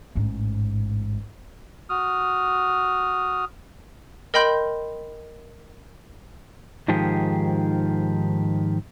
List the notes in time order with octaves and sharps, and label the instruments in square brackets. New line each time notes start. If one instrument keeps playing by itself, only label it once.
[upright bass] A1 G#2
[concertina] F#4 D#6 F6
[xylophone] A#4 D#5 G5 B5 C6 G6
[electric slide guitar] G#2 D#3 F3 G4 G#4